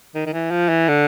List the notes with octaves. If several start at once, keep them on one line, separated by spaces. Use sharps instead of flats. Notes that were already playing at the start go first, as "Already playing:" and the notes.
D#3
D#3
E3
F3
E3
D3